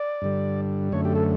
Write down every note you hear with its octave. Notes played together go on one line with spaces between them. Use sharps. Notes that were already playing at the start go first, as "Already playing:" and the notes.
Already playing: D5
G2 D3 G3
F#2 D3 A3 C#5
G4
A4